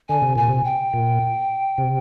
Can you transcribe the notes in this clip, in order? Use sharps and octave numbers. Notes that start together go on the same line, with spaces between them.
D3 G#5
C3
A#2 G#5
C3
G5
A#2
C3